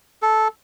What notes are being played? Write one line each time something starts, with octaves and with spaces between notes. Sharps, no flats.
A4